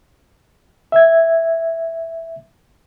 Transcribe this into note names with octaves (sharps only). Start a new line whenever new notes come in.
E5 G#6